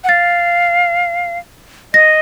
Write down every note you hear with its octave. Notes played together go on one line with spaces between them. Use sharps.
F#5
F5 A6
D#5 A#6